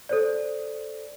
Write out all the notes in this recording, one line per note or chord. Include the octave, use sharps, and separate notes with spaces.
A4 C5 D5